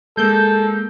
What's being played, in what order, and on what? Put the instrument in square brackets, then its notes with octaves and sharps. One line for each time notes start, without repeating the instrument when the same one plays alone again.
[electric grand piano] G#3 A#3 [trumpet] A4 [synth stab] G6